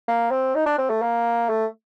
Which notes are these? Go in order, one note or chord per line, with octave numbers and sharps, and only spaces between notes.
A#3
C4
D#4
D4
C4
A3
A#3
A3